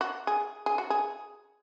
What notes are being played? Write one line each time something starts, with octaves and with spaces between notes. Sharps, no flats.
F#4
G#4
G#4
F#4
G#4